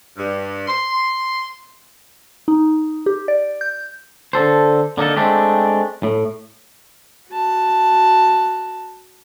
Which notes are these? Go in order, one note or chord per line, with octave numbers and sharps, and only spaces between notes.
G2
C6
D#4
G4
D5
G6
D3 A4 C5
D3 A#3 D#4 A4
G#3 A3 C4 D4 G4
A2
F#4 A5